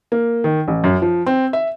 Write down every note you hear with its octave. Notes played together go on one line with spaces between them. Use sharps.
A#3
D#3
A1
F#2
F3
C4
E5